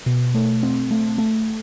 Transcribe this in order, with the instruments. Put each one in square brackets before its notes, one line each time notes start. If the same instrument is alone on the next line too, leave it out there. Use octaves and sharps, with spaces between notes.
[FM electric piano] B2
A3
C4
A3
A3